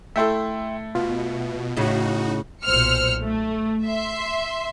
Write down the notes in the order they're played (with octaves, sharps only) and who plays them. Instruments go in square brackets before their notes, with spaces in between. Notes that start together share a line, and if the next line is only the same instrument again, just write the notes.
[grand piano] A3 E4 A4 [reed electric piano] E5 G5 C6
[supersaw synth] B2 [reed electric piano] F4
[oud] A2 C#3 [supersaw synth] D#4 F#4
[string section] B1 A#2 C5 E6 F6 C#7
A3
E5 C6